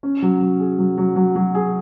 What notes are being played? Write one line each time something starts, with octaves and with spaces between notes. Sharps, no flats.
C#4
F#3
F#3
G#4
F#3
F#3
F#3
F#3
G#4